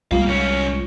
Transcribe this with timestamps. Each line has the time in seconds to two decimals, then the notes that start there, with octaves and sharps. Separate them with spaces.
0.12 C2 G3 G#3 A#3 F4 F5
0.26 G#2 C#4